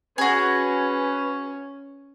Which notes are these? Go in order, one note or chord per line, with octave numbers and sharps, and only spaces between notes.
C#4 F#4 G#4 B4